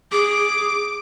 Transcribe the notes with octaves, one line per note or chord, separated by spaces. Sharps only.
G#4 D6